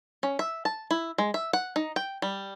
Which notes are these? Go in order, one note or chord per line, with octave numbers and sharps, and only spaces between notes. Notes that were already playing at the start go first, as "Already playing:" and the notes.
C#4
E5
A5
E4
G#3
E5
F#5
D#4
G5
G3